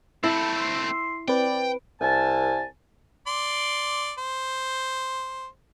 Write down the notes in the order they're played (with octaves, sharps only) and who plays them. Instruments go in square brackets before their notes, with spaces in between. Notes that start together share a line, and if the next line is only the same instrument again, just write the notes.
[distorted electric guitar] A3 C4 [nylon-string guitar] E4 [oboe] A4 [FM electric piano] E6
[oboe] C6
[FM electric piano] C4 B4 [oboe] D5 [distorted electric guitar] G5
[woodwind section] C2 G#5 A5
[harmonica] D5 C6
C5